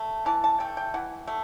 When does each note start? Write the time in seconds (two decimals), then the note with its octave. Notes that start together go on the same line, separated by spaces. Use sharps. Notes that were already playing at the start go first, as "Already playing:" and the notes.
Already playing: A3
0.26 E3 A5
0.44 A5
0.60 A3 G5
0.77 G5
0.94 E3 F#5
1.27 A3